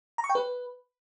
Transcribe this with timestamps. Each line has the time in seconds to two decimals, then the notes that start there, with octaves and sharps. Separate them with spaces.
0.18 A#5
0.24 C#6
0.30 G5
0.35 B4